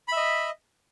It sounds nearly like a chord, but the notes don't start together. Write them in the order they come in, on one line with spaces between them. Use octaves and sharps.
B5 E5 D#5